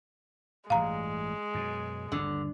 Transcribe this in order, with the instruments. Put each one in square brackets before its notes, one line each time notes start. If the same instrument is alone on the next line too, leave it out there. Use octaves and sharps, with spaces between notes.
[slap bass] A1 G2 [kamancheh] G#3 [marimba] F5 A#5
[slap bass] F#2 B2
[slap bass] G1 D#2 [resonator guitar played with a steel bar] D3